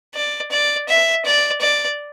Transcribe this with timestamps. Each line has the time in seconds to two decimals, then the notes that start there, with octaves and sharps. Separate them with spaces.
0.15 D5
0.51 D5
0.88 E5
1.25 D5
1.61 D5